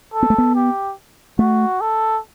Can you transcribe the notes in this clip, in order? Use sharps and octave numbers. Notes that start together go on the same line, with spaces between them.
A4
B3
A3
B3
G4
A3 F#4
A4